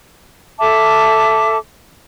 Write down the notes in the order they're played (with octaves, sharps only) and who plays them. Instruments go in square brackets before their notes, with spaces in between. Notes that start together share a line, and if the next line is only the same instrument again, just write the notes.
[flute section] A4 E5 A5 D6